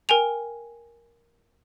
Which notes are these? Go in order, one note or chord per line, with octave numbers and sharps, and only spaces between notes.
A#4 G5 G#5 F7